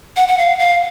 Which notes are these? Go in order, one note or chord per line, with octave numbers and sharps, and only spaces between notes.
F#5
F#5
F5
F5